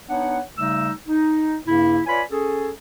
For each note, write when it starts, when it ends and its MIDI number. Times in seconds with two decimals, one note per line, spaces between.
0.09 0.40 59
0.09 0.40 62
0.09 0.40 63
0.09 0.40 73
0.09 0.40 78
0.58 0.91 49
0.58 0.91 55
0.58 0.91 57
0.58 0.91 63
0.58 0.91 88
1.07 1.57 63
1.66 1.99 43
1.66 1.99 49
1.66 1.99 58
1.66 1.99 64
2.07 2.22 65
2.07 2.22 71
2.07 2.22 73
2.07 2.22 74
2.07 2.22 80
2.07 2.22 83
2.31 2.70 61
2.31 2.70 68
2.31 2.70 69